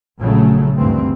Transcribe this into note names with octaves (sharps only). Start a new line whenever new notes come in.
A#1 C#3 F#3 A3
D2 G2 A#2 E3 C4